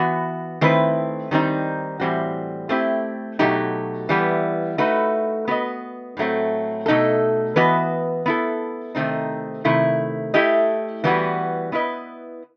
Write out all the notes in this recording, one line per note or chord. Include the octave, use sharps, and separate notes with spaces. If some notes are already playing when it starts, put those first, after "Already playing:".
Already playing: E3 B3 F#4
D#3 A3 C4 E4 B4
D#3 G3 C4 D#4
A2 E3 G3 C4 F#4
A3 C4 E4 G4
B2 F#3 A3 D#4 G4
E3 G3 B3
A3 D#4 F#4 B4
B3 F#4 B4 D#5
A2 F#3 A3 C4
B2 A3 D#4 A4
E3 B3 F#4 B4 D#5
B3 E4 A4
C3 D#3 A3 C4 D#4
C3 D#3 A3 E4
A3 E4 G4 D#5
E3 G3 B3 D#4 F#4
B3 E4 B4 D#5